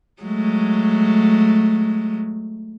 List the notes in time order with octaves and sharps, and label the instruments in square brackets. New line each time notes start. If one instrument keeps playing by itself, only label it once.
[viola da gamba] F#3 G#3 A3